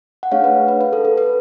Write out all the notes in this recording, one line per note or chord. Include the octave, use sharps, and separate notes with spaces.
F#5
A3 D4 G#4 C#5 F5
B4
B4
B4
A4
A4
B4